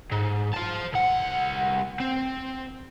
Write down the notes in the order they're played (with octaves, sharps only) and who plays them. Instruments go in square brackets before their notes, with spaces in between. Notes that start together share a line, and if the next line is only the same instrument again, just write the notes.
[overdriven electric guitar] G#2
C5 A5
C2 F#5
C4